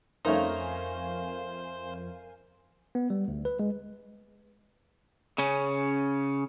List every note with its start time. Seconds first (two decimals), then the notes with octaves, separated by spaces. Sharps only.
0.25 F2 A3 C#4 D#4 A#4 C5 F5 G#5
2.95 B3
3.10 G3
3.28 D2
3.45 B4
3.59 G#3
5.38 C#3 C#4